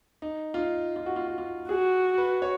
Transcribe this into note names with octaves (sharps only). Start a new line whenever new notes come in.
D#4
F4
D#4
F4
F#4
F4
F#4
F4
F#4 G#4
B4
C#5